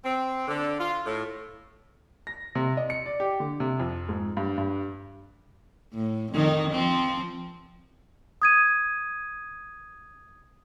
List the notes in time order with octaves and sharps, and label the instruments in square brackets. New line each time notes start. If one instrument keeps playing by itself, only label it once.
[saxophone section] C4
D3
F4
A2
[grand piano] A#6
C3
D#5
C#7
D5
G4
D3
C3
F2
G#2
G2
G2
[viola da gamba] A2
F2 D#3 D#4
F3 C4
[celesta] D#6 G#6 D#7